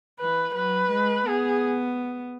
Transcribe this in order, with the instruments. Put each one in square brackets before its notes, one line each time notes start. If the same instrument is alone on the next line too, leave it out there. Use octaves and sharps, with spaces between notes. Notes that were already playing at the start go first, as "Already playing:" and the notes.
[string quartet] E3 [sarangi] B4
[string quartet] F#3 [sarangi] B4
[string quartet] G#3
[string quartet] B3 [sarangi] G#4